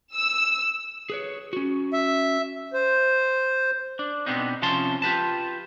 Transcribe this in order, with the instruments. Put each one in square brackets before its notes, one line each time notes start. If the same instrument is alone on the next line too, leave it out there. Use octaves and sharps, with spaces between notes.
[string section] E6
[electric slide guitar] G#4 B4 C#5
C#4 F#4
[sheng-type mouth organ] E5
[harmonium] C5
[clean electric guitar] D4
B2 D3 B3 C4 D4 D#4
C3 F3 C#4 A5 C6
F4 G4 B4 A5